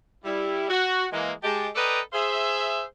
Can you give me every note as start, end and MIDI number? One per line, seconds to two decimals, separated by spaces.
0.24 0.68 55
0.24 0.68 64
0.69 1.05 66
1.12 1.31 52
1.12 1.31 56
1.12 1.31 58
1.43 1.67 56
1.43 1.67 67
1.43 1.67 81
1.76 1.99 69
1.76 1.99 71
1.76 1.99 74
1.76 1.99 75
1.76 1.99 79
1.76 1.99 82
2.12 2.82 68
2.12 2.82 72
2.12 2.82 76